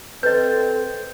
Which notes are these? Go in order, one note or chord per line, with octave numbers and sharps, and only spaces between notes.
C4 A4 B4 D#5 G6